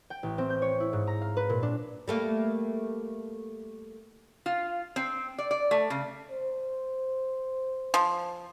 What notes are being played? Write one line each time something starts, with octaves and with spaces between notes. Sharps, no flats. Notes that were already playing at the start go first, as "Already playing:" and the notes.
G5
A1
C4
G6
C#5
E4
G#2
A#5
F5
B4
A#2
D4
G3 A3 A#3
F4
C4
D5
D5
A3
C#3
C5
F3